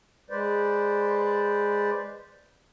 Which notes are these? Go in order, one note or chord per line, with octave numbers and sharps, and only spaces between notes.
G#3 B4 C5 D5